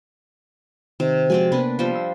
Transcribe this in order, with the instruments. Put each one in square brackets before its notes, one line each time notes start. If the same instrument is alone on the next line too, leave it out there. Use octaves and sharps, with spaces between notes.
[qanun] C3 [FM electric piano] D#3
[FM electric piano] F3 G#3 F#4 [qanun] C4 D5 G#5
[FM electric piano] C3 A#3 B3 [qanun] D4 B4
[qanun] F3 G3 C5
[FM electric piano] E6